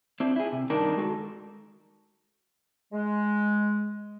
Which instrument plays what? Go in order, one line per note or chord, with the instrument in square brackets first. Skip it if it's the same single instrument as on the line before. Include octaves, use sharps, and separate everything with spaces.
[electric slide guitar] C4 D4 E4
E4 G#4
C3
G2 D#3 D4 D#4 A#4 A5
G#3 F#4 G#4 A4
[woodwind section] G#3